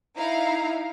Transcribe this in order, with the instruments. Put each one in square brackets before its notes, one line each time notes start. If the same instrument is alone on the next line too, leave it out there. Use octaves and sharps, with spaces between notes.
[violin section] D#4 E4 F5 A#5